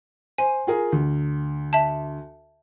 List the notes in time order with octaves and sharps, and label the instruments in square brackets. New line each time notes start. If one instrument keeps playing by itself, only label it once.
[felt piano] C5 [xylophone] G#5
[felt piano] F4 G#4 A#4
D2
[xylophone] E5 A5